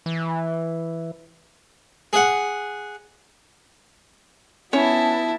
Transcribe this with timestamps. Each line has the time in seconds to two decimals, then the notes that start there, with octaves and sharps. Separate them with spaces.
0.06 E3
2.13 G#4 F#5
4.73 B3 C#4 E4 C#5 A5